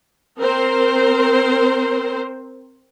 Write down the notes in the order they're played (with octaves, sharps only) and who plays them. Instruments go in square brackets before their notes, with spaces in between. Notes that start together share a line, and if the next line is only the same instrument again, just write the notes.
[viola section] C4 A#4 C5